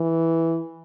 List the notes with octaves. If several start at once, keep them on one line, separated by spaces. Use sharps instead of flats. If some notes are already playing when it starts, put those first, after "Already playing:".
Already playing: E3